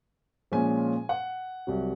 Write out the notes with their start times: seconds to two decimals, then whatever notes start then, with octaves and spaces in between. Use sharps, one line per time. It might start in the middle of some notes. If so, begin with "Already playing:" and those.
0.52 A#2 F3 G#3 C#4 F4 G#5
1.09 F#5
1.67 C2 C3 F#3